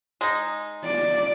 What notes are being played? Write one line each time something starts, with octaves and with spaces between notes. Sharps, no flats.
G#3 D#4
D5